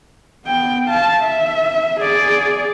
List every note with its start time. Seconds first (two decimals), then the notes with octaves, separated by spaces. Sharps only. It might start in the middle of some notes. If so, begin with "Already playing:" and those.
0.46 B3 G5
0.88 F5 A5
1.21 E5
2.01 G#4 D5